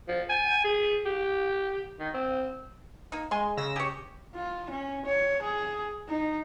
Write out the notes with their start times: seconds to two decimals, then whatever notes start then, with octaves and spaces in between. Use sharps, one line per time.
0.08 F3
0.29 G#5
0.64 G#4
1.05 G4
1.99 D#3
2.14 C4
3.12 A#3 D#4
3.31 G#3 G#5 C6
3.57 C#3 E6 A#6
3.76 G4 G#4 C#5
4.35 F4
4.70 C#4
5.06 C#5
5.42 G#4
6.09 D#4